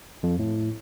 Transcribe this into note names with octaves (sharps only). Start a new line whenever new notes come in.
F2
A2